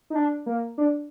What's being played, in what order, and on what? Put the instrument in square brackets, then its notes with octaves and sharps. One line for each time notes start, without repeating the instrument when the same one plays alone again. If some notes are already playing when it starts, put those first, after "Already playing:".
[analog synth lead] D#4
D4
A#3
D4